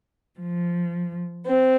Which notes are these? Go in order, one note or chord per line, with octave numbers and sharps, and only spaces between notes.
F3
C4